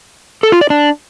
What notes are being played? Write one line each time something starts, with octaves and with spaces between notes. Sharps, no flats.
A4
F4
D5
D4